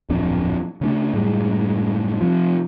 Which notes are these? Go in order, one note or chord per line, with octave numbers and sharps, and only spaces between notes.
D1 F2 A#2 D4
C#3 A3 D4
F#1 A2 G3 G#3
C3 F3